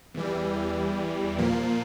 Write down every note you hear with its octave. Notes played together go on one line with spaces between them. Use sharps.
E2 E3 G3
A#2 F3 A#3